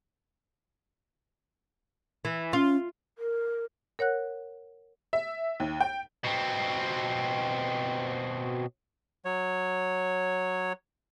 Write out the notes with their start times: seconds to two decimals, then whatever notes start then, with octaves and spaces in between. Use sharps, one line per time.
2.25 E3
2.53 C#4 F4
3.18 A#4
3.99 A#4 C#5 F#5 F#6
5.13 E5
5.60 D#2
5.81 G5
6.24 B2 C4
9.25 F#3 C#5